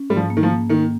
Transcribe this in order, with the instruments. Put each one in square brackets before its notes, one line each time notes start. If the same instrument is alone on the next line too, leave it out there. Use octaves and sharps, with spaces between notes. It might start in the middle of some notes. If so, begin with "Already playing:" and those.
Already playing: [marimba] C#4
[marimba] G#2 [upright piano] G3
[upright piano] F3
[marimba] A#3
[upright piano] D#3
F3
[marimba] A#3
[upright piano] D#3 [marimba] A#3